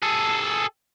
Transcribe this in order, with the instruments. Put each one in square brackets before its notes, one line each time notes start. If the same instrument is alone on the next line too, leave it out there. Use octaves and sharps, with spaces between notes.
[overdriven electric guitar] G#4 A4